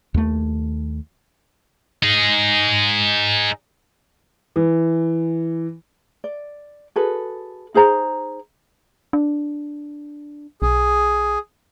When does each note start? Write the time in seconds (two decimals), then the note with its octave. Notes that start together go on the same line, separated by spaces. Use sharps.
0.14 D#2 A3
2.03 D#4 G#4
4.56 E3
6.24 D5
6.96 F#4 G#4 A4 B4
7.74 D#4 G#4 C5 A#5
9.13 D4
10.62 B1 G#4